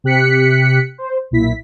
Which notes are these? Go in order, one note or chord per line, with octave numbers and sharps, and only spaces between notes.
C3 G4 F#6 B6 C#7
C5
B1 A#2 E4 B6